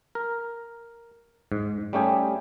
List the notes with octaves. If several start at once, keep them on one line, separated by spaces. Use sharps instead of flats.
A#4
G#2
G3 A3 C#4 G4 G#4